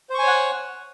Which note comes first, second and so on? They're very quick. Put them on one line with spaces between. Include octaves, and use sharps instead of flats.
C5 C#6 G#5 C#5 F#5